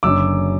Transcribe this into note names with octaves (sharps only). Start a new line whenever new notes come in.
F#1 F#2 D3 D6 E6